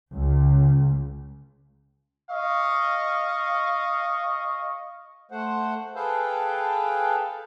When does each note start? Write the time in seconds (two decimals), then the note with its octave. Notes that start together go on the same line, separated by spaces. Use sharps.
0.13 C#2
2.30 D#5 F5 C#6
5.31 A3 C5 F#5
5.95 G#4 A4 B4 F5 G5